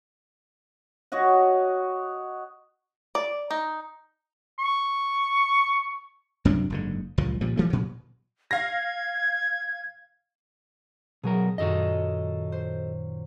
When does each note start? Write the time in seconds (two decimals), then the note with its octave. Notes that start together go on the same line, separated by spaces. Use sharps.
1.12 F#4 C#5 D#5 F#5
3.15 D5
3.51 D#4
4.59 C#6
6.45 F#2 C3 F#3 D4
6.70 F#1 G#2 D3
7.18 F#1 C#2 A#2 F3
7.41 A#2 F3 G3
7.57 E3 G3 A3
7.70 A#2 F#3
8.51 F5 G#6 A#6
11.24 B2 F#3 G#4 A#4
11.58 F#2 A#2 D#3 F#4 A4 D#5
12.52 C5